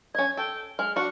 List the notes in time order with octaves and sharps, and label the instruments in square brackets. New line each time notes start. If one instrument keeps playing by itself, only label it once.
[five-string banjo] C#4 D#5 [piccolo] G#6
[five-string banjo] A4 [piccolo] G5
[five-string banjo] G#3 [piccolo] F6
[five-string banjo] D4 F#4 [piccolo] C#7